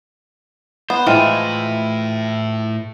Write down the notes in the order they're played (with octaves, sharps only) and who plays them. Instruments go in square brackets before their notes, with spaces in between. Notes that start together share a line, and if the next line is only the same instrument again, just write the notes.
[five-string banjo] B3 [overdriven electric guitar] C5
[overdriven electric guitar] A2 [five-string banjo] E3 F3 G#3 [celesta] G5 F6 D#7